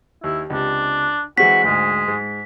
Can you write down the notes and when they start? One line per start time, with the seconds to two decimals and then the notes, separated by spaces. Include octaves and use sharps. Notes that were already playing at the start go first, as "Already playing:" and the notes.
0.24 D#2 E4
0.50 C#2 C3 D4
1.38 E3 G#3 C4 F#4 B6
1.63 D2 G#2 G#3
2.08 G#2